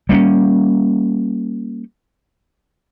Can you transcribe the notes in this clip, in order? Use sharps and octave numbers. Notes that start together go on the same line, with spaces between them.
G3 A#3 B3 C#4